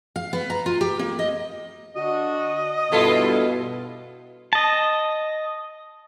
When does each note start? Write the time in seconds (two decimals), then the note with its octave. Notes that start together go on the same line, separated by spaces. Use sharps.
0.16 F5
0.33 B3
0.50 A#5
0.66 F4
0.81 G4
0.99 A#3
1.19 D#5
1.96 D3 D4 F#4 D#5
2.92 G2 B2 E4 F4 A4
4.53 D#5 A5